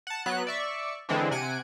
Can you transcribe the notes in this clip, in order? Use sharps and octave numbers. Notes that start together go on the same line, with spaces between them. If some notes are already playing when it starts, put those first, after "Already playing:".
F#5 A5
F#3 B3 F#6
D5 E5 C#6
D3 E3 G#3 C4 D4
C3 F#5 G#5 D7